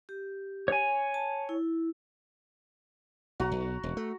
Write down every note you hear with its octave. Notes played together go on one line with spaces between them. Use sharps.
G4
C#5 G#5
A5
E4
B1 F#4 A#5
B1
E1
A3